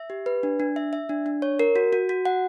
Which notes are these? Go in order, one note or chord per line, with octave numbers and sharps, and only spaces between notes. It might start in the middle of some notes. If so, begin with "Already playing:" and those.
Already playing: E5
G4
B4
D4
D4
E5
E5
D4
D4
C#5
A#4
F#4
F#4
F#4
F#5